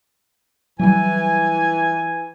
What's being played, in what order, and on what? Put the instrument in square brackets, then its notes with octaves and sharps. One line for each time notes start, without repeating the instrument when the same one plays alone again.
[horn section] E3 G#5 [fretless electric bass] F#3 G3